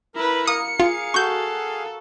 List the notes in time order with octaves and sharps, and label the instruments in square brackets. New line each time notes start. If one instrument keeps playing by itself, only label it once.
[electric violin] E4 B4 [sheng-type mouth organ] A#4 A#5
[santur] A#3 [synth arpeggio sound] D#6 [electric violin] C#7
[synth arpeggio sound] F4 [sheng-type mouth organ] G#4 F5
[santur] F#4 [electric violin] A4 [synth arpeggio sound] C#6 G6